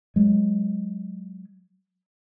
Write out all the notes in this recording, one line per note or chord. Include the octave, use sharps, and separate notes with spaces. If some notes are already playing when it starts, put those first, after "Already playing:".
F#3 G#3